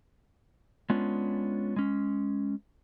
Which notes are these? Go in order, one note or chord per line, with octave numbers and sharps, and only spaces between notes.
G#3 B3 C#4 D4 F4
G#3 C#4